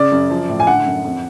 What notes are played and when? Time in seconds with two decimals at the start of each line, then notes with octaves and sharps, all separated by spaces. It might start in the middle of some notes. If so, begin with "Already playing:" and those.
Already playing: C#3 D5
0.11 F#2
0.30 F3
0.49 A2
0.60 G#5
0.67 D3 F#5
0.86 F#2
1.04 F2